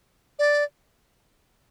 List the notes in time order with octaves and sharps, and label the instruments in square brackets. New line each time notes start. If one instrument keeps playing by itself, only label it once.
[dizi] D5